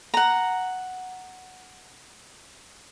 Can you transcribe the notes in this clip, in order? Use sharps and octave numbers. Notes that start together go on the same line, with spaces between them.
F#5 A#5